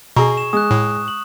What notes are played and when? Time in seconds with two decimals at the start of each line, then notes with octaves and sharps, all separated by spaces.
0.16 B2 G#4 A#5 C#6
0.37 E7
0.53 G#3 D#6 F#6
0.71 A2
1.08 F#7